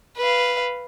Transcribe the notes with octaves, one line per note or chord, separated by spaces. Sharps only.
B4 F5